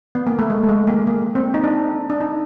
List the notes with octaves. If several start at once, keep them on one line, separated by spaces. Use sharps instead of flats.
B3
A#3
A3
G#3
A3
G#3
A#3
A#3
C4
D#4
D4
D4
D#4